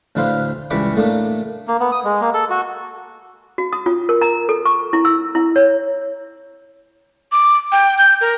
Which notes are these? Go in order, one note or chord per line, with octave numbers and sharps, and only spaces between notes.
D2 A2 D4 B4 C5 F5
C#2 E3 G3 B5 C#6 D6
A2 A3 A#3 D4
A#3
B3
D#6
G#3
A#3
A4
F#4
F#4
D#6
F4
A#4
A#5
A4
C#6
E4
E6
E4
C#5
D6
G5
G6
A#4